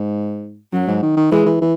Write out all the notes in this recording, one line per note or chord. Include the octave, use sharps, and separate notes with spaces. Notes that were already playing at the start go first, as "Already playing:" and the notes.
Already playing: G#2
F#2 F#3
G#2
D#3
D#3
E3 G#3
E3
E3